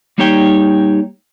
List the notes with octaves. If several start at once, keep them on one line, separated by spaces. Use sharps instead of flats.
G3 A#3 D#4 G4 C#5 G5